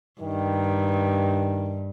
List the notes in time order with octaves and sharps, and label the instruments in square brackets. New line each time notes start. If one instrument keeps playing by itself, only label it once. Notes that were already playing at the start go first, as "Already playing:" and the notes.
[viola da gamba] G2 [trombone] D#3